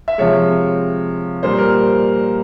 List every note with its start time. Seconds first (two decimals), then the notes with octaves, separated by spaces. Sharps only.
0.08 E5
0.18 C3 F3 G#3 C#5
1.43 A#2 G3 C5
1.59 A#4